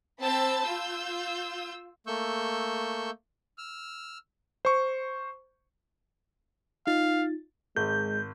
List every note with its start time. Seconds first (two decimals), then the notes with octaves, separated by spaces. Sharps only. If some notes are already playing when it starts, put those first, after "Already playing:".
0.21 C4 A5 B5 E6 G6 A6
0.63 F4 E6 G6
2.07 A3 A#3 C#6 E6 G6
3.58 E6 F6
4.65 C5 C#6
6.87 D#4 F4 F5 A6
7.76 G#1 G#3 G6